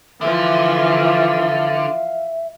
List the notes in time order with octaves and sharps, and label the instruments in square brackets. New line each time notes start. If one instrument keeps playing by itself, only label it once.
[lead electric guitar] D3 [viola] E3 F3 [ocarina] E5 [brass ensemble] F5